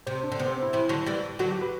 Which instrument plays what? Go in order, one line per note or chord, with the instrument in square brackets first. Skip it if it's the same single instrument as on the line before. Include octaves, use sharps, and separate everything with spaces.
[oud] C3 [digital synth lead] C5
[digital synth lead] D4
[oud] D3
[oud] C3 [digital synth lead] B3
[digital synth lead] C4
E4
[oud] C3 E3
D3 F#3
E3 G3
[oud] D3 F#3 [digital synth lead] F#4
[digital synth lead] G4
B4